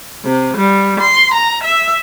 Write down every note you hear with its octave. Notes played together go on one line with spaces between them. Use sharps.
C3
G3
C6
A#5
E5